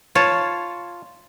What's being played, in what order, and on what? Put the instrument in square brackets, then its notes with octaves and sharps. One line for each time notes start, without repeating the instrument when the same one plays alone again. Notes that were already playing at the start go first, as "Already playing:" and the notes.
[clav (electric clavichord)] F4 A5 [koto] C#5